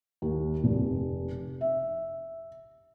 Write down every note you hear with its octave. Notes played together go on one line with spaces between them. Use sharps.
D#2
F1
E5